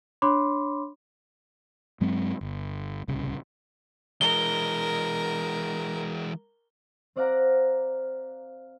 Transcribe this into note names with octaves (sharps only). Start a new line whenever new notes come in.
D4 C#5 B5 C6 D6
G2 F#3 G#3 C4
G1
D1 C2 C#3
E3 G#3 A#4 G7
C4 C5 D5 F5 F#5 A#5